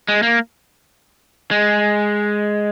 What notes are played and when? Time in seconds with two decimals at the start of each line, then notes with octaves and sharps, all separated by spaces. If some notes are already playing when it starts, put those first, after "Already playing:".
0.08 G#3
0.23 A#3
1.51 G#3